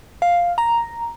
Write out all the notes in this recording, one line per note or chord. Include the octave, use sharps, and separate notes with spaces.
F5
A#5